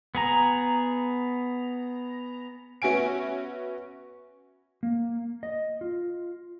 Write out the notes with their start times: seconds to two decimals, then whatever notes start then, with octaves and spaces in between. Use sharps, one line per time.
0.15 B3 G#4 A#5
2.82 B3 C#4 F#4 E5 G#5 D7
4.83 A#3
5.43 D#5
5.81 F4